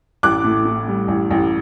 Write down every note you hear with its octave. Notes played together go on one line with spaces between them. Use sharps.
A1 D6 F#6
A2
A2
G3
A1
A1